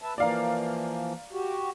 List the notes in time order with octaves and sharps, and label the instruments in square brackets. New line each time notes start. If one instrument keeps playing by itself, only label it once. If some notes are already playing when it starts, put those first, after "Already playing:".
[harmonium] B4 E5 A5
[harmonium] E3 F3 A#3 [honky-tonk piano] D5 F5 A#5
[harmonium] F#4 G4